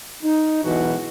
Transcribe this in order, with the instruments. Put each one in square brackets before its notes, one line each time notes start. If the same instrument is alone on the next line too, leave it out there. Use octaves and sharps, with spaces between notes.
[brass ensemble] D#4
B1 G#2 B2 E3 F#4